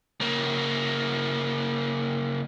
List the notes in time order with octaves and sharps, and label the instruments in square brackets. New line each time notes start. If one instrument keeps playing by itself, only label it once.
[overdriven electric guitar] C#3 A#3